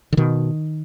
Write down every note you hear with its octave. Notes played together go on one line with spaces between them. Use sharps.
D3
B2 D#3